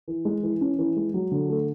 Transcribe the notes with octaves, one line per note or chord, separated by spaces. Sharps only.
E3
G#3
E3
C#4
E3
G#3
F#3
D3
A3